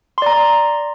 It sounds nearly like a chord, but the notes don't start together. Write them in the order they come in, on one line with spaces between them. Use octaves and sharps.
C6 D5 A#5